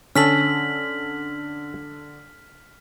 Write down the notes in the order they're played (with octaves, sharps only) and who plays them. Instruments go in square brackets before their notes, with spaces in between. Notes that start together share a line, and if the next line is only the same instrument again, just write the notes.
[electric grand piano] D3 [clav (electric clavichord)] C#4 A4 [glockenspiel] F6 B6 F#7